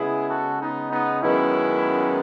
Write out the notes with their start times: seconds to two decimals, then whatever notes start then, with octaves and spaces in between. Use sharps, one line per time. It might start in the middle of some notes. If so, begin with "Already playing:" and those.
Already playing: C#3 G#3 B3 E4 G#4
0.29 F#4 A4
0.61 B3 D#4
0.91 B3 D#4
1.22 F#2 D#3 G#3 B3 C#4 E4